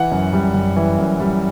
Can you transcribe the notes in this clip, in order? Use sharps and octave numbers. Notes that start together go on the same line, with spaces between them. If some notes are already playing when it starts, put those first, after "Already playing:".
Already playing: E3 F#5
F#2
G3
F#2
E3
F#2
G3